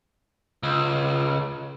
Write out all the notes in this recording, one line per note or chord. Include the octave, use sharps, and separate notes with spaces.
C#2